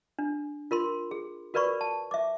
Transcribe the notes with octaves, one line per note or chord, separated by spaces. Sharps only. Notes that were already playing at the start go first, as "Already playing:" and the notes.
D4
F4 A#4 B5 C6
G#4
F#4 A#4 B4 D5 B5 C#6
A5
E5 D6